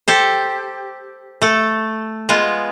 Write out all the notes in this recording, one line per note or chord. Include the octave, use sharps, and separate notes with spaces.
G4 A4 C5
A3 A4
G#3 B3 F4